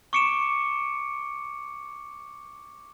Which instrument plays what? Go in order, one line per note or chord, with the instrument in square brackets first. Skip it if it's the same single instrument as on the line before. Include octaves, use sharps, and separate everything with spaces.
[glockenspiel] C#6 D6 C#7 D7 E7